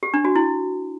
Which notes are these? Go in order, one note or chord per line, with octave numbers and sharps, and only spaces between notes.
G4
D4
F#4
E4